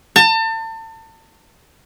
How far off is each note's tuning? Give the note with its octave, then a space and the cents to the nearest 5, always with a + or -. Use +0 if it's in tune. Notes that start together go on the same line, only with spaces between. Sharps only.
A5 +35